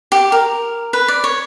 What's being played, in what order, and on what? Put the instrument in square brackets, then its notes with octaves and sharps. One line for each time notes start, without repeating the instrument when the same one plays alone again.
[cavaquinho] G4
A#4
B4
D5
C#5